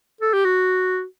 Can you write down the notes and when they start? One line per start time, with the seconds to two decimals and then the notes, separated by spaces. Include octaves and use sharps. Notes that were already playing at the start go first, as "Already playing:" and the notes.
0.21 A4
0.33 G4
0.45 F#4